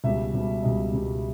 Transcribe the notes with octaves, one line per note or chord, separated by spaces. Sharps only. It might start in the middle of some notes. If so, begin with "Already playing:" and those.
C#2 B2 G3 E5
C#2 B2 G3
C#2 B2 G3 D#5
C#2 B2 G3